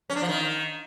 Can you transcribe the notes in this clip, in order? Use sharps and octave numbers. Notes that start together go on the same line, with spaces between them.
C#4
D4
F3
D#3